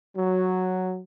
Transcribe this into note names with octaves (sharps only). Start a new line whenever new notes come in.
F#3